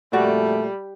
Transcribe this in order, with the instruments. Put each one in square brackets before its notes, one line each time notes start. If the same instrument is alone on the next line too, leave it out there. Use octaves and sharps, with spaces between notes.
[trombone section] F2 A#2 A3 [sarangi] G3 [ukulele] F#4 D5